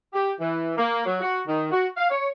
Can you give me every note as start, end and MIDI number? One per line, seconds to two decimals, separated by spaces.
0.13 0.31 67
0.40 0.73 52
0.77 1.01 58
1.05 1.18 54
1.21 1.41 66
1.47 1.69 51
1.71 1.87 66
1.97 2.06 77
2.10 2.27 73